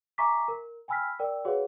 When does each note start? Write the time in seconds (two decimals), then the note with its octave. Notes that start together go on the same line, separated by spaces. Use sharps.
0.18 E5 G#5 A#5 C#6 D6 B6
0.48 A#4
0.88 G5 G#5 B5 E6 F6 B6
1.19 A#4 D5 G5 E6
1.45 F#4 G#4 B4 C#5 F5 F#5